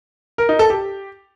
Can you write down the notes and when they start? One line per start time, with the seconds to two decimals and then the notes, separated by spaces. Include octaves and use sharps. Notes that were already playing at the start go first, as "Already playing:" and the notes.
0.38 A#4
0.49 D#4
0.59 A4
0.70 G4